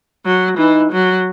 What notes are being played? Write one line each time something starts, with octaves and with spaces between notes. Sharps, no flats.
F#3
E3 D#4
F#3